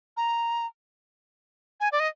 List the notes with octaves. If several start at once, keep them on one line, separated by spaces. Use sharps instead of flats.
A#5
G#5
D5
D#5